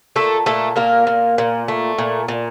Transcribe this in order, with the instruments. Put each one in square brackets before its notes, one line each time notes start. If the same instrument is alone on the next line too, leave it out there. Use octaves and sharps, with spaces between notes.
[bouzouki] A#2 A3 A4
A#2 A3 A4
A#2 A#3 A#4
A#2
A#2
A3
A#2
A#2